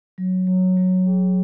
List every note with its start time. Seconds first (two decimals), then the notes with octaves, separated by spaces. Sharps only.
0.18 F#3
0.47 F#3
0.77 F#3
1.06 G#4